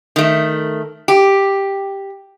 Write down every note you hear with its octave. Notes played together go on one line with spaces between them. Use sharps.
D#3 A3
G4